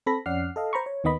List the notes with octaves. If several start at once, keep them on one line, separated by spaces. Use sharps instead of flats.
C4 A4 B5 A#6
F2 C#4 D5 F#5 F6 C7
A4 D#5 F5
C5 A#5 B5 C#6
C#5
D#2 D#3 B3 D#5 B5